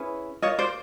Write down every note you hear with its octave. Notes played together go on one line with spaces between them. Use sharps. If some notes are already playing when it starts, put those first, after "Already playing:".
Already playing: C#4 E4 G#4 B4
F4 A#4 C#5 D#5
C5 D5